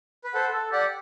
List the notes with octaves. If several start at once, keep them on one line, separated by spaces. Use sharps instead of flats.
B4
A4 C5 F#5
A4
G4 D5 F#5